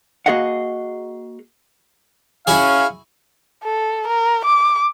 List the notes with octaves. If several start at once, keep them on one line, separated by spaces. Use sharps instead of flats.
A#3 F#4 G#4 D#5 F5 F#5
C#4 E4 F#4 G#4 F5
A4
A#4
D6